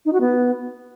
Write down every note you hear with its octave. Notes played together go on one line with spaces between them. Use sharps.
D#4
F#4
B3